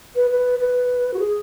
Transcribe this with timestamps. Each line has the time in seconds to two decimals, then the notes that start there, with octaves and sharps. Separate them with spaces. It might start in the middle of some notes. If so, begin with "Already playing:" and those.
0.15 B4
0.30 B4
0.59 B4
1.13 F#4
1.19 G#4